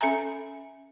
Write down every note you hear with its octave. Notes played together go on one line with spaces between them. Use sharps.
C#4 A4 E5 G#5 A#5